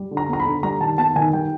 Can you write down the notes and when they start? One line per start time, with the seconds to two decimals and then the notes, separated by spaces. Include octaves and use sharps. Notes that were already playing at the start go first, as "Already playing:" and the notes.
Already playing: G3
0.11 D3
0.17 A#5
0.29 B3 A#5
0.40 B5
0.46 D3
0.63 G3 A#5
0.81 D#3 A5
0.98 B3 A5
1.16 D#3 G#5
1.33 G3 G5